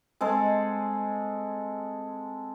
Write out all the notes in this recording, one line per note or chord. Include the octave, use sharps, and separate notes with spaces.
G#3 C4 A4